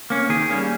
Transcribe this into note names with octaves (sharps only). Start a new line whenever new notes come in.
A#3 C#4
D#3 G#4
G3 A#3 C#4